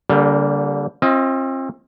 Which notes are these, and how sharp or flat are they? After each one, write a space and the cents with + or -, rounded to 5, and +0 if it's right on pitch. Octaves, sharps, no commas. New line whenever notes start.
D3 -35 G3 +0 A#3 +0
C4 +35 F4 -10 D#5 +25